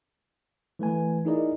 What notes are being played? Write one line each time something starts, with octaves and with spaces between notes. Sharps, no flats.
E3 A3 B4 G#5
D#4 E4 G#4 A#4 D5 D#5